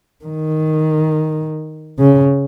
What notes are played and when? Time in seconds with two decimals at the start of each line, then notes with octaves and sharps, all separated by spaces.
0.25 D#3
1.99 C#3